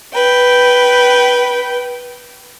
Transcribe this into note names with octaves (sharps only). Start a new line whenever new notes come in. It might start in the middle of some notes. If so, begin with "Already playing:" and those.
B4 G5